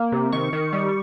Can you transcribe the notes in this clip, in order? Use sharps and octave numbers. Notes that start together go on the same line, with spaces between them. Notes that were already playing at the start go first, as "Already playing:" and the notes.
Already playing: A#3
C3
D#3 C#6
D#3
G3